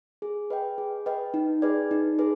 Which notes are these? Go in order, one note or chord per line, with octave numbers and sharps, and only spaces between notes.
G#4
B4 D#5 G5
G#4
B4 D#5 G5
D#4
G#4 B4 D5
D#4
G#4 B4